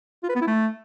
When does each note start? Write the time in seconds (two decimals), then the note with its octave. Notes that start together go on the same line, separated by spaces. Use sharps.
0.24 F4
0.29 B4
0.35 B3
0.41 E4
0.47 A3